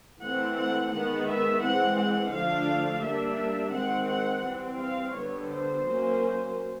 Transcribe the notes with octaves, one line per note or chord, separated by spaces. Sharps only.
E3 A3 C4 F#5
F#5
D#3 G#3 B3 F#5
E5
E3 G#3 C4 F#5
F#5
D3 F3 A3 D4 F5
G3 A#3 D4 E5
D#3 G#3 C4 F#5
F#5
E3 G3 C4
F5
D3 G3 B3 C#5
C5
F#3 A#3 C#4